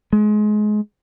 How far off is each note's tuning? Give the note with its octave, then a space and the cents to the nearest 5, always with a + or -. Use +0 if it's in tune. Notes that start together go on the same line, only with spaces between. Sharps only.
G#3 +25